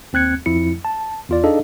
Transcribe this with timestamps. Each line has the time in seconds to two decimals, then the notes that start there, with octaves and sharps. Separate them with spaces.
0.13 D#2 C4 F#6 G#6 C#7
0.46 F2 F3 E4 C#7
0.85 A5
1.29 E2 F4 D5
1.44 D4 D#4 G#4 A4 D#5 F5